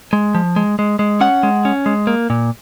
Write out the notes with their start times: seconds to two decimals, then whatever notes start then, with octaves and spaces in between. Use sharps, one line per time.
0.13 G#3
0.35 F3
0.56 G#3
0.79 G#3
0.99 G#3
1.21 C#4 F#5
1.43 G#3
1.65 C#4
1.86 G#3
2.07 A#3
2.30 A#2